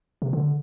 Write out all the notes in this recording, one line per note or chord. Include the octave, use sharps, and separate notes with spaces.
C3
D3